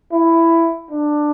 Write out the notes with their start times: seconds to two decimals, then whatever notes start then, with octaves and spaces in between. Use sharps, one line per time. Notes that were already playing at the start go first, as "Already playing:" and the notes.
0.12 E4
0.91 D4